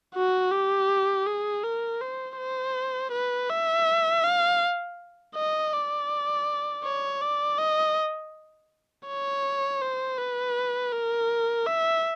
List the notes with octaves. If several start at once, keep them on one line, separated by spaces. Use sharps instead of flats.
F#4
G4
G#4
A#4
C5
C5
B4
E5
F5
D#5
D5
C#5
D5
D#5
C#5
C5
B4
A#4
E5